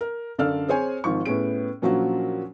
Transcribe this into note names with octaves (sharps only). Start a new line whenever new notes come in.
A#4
F#2 D3 A4 D5 F5 F6
C4 G#4 C5 C#5 G#5
G#1 G#2 F3 C#6
A2 B3 C#4 G#4 D7
A#2 F3 F#3 C#4 D4 F#4